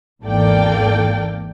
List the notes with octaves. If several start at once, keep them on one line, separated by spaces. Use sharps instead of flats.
G#1 E2 A#3 A4 D5 G5